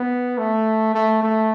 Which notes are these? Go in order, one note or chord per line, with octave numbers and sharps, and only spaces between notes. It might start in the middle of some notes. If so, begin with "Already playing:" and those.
Already playing: B3
A3
A3
A3